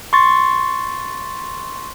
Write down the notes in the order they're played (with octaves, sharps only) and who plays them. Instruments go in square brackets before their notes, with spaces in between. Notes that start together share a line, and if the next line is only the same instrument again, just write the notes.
[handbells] C6 C#6 A6